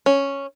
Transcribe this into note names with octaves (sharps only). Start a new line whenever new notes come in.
C#4